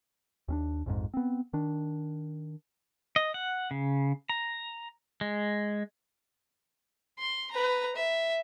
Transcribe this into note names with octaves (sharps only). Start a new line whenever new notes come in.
D#2 C#4 D4
A#1 F2 G#2
B3 C4
D#3 D4
D#5
F#5
C#3
A#5
G#3
C6
B4 A#5
E5